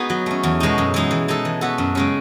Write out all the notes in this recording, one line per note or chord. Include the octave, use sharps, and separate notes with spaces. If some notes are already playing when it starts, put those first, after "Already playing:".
Already playing: B3 D#4 F#4 G#4
F#3
A3 C#4
E2
B2 G#3 D#4
F#2
E3 G#3 D#4
E3
G#3 D#4 A4
E3
B3 F#4 A4
F#2
C#3 G#3 C#4